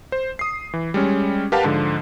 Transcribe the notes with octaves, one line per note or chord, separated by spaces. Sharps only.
C5
D#6 C7
E3
G3 G#3 C#4
G4 A#4 B4 F5 F#5 A5
G#2 D3 F3